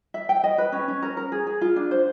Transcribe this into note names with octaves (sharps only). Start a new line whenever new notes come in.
E5
G5
D#5
B4
C#4
C#4
A#4
A#4
G#4
G#4
F4
D4
C5